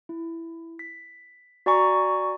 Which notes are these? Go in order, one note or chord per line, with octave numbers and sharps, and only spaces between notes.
E4
B6
F#4 D5 G#5 A#5 C#6